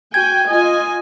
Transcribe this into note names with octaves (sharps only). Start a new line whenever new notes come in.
F#4 G5 G#5 G#6
F4 D#5 G#5